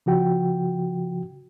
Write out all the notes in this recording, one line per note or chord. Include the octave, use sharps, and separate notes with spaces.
C#3 F3 F#4 G5